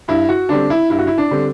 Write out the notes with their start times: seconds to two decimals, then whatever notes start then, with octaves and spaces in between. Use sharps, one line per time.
0.08 G2 E4
0.29 F#4
0.49 D3 G3 C4 D4
0.70 E4
0.90 G2 E4
0.99 F#4
1.07 E4
1.18 D4
1.31 D3 G3 C4